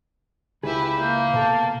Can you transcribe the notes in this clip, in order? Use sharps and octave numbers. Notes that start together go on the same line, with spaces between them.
C#2 E4 G4 G#4 B4
A#3 G6
B2 A4 A5